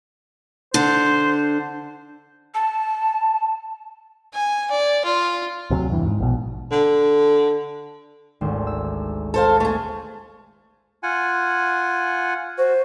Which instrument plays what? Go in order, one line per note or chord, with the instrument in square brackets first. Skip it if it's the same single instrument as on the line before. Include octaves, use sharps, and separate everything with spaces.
[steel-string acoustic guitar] D3 [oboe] C5
[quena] A5
[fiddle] G#5
D5
F4
[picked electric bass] D2 C3 F#3
E2 G2 E3
G#2
A#1 B2
[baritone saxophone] D3
[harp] G#1 D2 C5
E6
[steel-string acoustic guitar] A4 C5 F5
A3 G#4
[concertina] F4 F#5 G#5
[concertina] F#4 [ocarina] C5